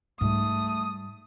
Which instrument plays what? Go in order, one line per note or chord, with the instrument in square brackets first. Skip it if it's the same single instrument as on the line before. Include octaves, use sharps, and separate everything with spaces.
[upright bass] G#2 G3 [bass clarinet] A3 [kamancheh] D#6